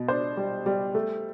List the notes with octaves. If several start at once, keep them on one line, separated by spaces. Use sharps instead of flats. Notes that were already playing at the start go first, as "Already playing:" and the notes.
Already playing: B2
D4 C5
G3
G3
A3